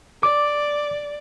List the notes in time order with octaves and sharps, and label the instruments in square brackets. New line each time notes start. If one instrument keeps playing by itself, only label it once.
[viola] D5 [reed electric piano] D6